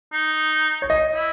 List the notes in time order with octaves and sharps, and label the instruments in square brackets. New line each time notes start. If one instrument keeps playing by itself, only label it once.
[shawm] D#4
[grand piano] C#5
D#5
[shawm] E4